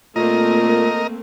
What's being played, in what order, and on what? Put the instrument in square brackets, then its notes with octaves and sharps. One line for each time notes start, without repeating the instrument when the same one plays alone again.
[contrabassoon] A#2 [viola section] A3 A#3 C4 [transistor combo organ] A#4 D#5